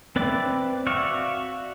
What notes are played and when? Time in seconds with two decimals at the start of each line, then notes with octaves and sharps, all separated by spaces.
0.16 C4 B4 D5 E5 D6
0.87 F#4 D5 E5 F5 C#6